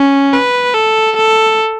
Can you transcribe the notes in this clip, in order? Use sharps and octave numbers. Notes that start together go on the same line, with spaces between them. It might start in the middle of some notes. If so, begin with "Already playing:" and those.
Already playing: C#4
B4
A4
A4